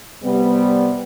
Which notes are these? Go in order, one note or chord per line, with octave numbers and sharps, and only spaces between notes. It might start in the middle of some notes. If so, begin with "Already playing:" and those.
C3 G3 B3